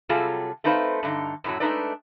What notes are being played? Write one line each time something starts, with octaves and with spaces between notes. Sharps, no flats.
C3 F#3 G3 F4 G#4 A4
A3 C4 D#4 B4 C5 F5
G2 D3 D#4
F#2 A2 F#3
G#3 A3 D4 D#4 B4 D5